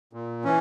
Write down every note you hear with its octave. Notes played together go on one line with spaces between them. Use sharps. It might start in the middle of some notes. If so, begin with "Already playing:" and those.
A#2
E3 C#4